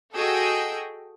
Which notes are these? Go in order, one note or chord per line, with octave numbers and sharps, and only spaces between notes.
F#4 G#4 A4 D#5 G5 E6